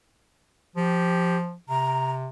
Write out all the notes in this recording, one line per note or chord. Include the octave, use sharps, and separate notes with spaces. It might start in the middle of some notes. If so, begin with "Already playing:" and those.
F3 G4
C3 A#5